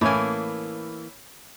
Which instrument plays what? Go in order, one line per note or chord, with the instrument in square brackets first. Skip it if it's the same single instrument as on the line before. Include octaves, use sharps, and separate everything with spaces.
[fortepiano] A2 C#4 G#5 [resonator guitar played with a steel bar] E3 A#3